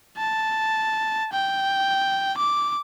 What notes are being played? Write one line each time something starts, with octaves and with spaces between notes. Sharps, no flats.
A5
G5
D6